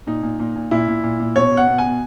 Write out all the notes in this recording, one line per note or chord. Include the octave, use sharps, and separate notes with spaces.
A#2 D#4
A#2
A#2
A#2
A#2 E4
A#2
A#2
A#2
B2 C#5
B2
F#5
B2
G#5
B2